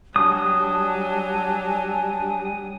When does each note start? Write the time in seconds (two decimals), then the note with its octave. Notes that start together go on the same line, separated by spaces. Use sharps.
0.16 F#3 G3 D4 G#5 A5 D#6